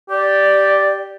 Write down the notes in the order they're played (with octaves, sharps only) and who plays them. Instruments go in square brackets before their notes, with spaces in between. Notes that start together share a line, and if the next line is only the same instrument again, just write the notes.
[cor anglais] G4 [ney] D5